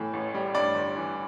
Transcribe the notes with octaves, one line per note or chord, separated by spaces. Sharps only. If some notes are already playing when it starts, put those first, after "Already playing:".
Already playing: A2 E3
A1
G3
G2 D5
G1
E3